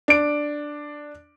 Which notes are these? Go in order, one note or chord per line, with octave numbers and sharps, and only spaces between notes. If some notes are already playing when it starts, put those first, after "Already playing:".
D4 D7